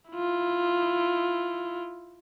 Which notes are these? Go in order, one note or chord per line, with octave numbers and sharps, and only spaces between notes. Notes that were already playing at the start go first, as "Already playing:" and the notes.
E4 F4